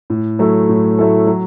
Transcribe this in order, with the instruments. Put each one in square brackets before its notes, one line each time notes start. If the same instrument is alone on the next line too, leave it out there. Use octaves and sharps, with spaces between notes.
[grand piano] A2
F#3 A3 E4 A4
A2
F#3 A3 E4 A4
F#3